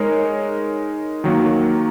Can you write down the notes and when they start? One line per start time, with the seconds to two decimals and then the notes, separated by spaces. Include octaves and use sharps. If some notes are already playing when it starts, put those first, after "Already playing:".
Already playing: G#3 D#4 A#4 C#5
1.24 D#3 F#3 A#3